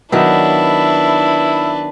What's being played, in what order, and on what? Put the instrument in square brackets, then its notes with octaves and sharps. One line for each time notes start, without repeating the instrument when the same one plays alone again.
[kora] D#3 F#3 B3 [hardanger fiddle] D4 B4 [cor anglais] E4